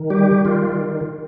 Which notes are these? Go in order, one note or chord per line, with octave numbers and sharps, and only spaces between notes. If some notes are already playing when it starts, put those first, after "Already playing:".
Already playing: D#3
G3 G4
D#3 F4